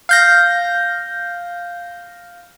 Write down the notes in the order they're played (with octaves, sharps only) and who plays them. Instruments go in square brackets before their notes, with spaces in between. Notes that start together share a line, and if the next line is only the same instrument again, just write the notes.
[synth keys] F5 G6 A#6